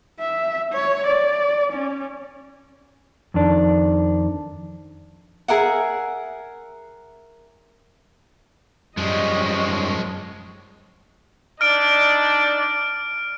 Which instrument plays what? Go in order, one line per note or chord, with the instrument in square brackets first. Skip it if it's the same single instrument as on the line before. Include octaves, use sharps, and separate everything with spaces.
[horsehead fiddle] E5
C#5
D5
C#4
[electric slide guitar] F2 D#3 D4
[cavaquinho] G#4 A#4 E5 F#5
[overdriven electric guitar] F#2 G3 [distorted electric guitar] F3 G#3 [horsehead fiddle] C#5 D#5
[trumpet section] D4 D#4 D5 [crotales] F6 D7